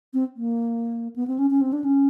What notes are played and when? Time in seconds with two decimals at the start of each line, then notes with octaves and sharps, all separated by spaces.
0.14 C4
0.36 A#3
1.16 B3
1.28 C4
1.39 C#4
1.50 C#4
1.61 C4
1.73 D4
1.84 C#4